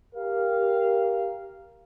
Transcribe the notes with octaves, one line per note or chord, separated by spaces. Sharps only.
G4 A#4 F5